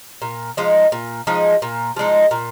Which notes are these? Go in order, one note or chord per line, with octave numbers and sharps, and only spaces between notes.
A#2
F3 G#3 D#4
A#2
F3 G#3 D#4
A#2
F3 G#3 D#4
A#2